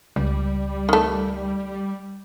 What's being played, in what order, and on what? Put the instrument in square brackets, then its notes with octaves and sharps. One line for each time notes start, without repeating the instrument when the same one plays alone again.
[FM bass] C#2 [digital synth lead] G3
[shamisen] D#3 A3